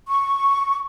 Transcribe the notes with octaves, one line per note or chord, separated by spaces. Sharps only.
C#6